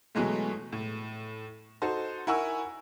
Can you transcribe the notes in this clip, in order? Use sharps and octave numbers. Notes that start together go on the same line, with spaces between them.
B2 E3 F#3 G#3 A3
A2
D#4 F#4 A4 C5
E4 A#4 F#5 G#5 C#6 E6